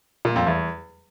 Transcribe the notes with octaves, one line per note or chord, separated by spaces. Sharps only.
A#2
F2
E2